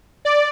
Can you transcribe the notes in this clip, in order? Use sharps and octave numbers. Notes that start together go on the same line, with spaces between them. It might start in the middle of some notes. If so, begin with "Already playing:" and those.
D5